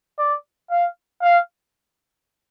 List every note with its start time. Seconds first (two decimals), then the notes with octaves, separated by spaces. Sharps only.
0.18 D5
0.70 F5
1.22 F5